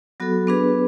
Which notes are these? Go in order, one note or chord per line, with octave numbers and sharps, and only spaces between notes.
F#3 B3 F#4 A4
B3 D4 G#4 B4